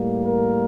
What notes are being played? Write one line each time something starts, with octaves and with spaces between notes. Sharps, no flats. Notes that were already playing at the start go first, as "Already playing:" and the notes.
Already playing: A2 G3 A#3
A#4